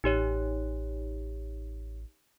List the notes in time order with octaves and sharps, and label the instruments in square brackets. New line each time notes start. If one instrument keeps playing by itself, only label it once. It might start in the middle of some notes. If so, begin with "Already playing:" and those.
[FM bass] A1 [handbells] D#4 G4 C#5